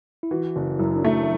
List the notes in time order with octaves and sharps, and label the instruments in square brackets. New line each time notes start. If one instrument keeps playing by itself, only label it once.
[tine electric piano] E4
[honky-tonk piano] E3 [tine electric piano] F#4
[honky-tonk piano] F#1
[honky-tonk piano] F#2 [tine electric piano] E4
[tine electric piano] D4
[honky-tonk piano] A3